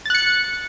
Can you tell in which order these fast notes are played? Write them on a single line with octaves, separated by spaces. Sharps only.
A6 F#6 C#7